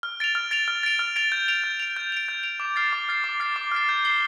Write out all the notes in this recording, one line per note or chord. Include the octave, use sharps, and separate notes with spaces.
F6
A6 D7 F7
F6
A6 D7 F7
F6
A6 D7 F7
F6
A6 D7 F7
G6
D7 F7
G6
D7 F7
G6
D7 F7
G6
D7 F7
D6
F6 A6 C7
D6
F6 A6 C7
D6
F6 A6 C7
D6
F6 A6 C7
G6
C7 G7